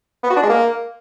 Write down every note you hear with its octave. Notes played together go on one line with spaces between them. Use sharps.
B3
F#4
D4
G#3
A#3